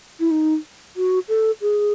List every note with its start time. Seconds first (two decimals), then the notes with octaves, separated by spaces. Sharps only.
0.20 E4
0.31 D#4
0.97 F#4
1.29 A4
1.61 G#4